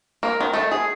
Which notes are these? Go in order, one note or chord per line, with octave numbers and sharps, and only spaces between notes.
A#3
D#3
A3
G#4